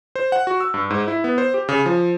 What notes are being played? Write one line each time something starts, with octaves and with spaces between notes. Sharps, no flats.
C5
F#5
F#4
E6
G2
G#2
E4
B3
C5
G4
C#3
F3